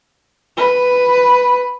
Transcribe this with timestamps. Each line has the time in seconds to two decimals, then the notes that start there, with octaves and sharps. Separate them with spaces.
0.57 B4